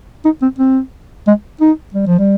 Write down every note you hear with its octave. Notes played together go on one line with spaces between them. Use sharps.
D#4
C4
C4
G#3
D#4
G3
F3
G3